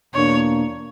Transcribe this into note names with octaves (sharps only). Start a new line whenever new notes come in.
E2 B2 A#3 D4 C#5